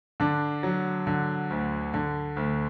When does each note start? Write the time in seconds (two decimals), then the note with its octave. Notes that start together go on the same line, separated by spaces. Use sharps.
0.20 D3 D4
0.63 F#3
1.07 D3
1.50 D2
1.94 D3
2.37 D2